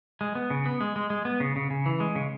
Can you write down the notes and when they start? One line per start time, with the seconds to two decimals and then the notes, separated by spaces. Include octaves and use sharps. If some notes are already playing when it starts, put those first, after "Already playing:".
0.21 G#3
0.35 B3
0.50 C#3
0.65 B3
0.81 G#3
0.96 G#3
1.10 G#3
1.25 B3
1.40 C#3
1.56 C#3
1.70 C#3
1.86 E3
2.00 G#3
2.15 C#3